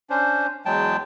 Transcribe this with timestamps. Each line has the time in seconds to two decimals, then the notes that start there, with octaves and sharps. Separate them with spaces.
0.10 C#4 D4 C5
0.66 E2 F#3 G#3 G5 A5